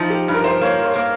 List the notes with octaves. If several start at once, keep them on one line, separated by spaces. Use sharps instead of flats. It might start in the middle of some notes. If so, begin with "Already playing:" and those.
Already playing: F3 D#4
G4
G2
A#4
C5
A#3 C#5
C#5
A#3